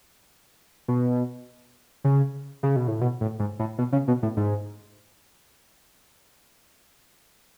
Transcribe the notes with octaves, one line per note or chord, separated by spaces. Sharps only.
B2
C#3
C#3
B2
A2
B2
A2
G#2
A2
B2
C#3
B2
A2
G#2